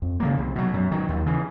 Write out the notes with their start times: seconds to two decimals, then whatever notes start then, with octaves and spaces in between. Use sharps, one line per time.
0.02 F2
0.20 C#3 F3 A#3
0.38 C2
0.56 B2 F#3
0.74 F#2
0.92 D#3 F#3
1.09 D#2
1.26 C#3 E3